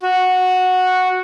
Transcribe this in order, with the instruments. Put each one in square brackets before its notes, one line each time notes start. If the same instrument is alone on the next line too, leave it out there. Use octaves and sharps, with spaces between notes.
[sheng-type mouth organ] F#4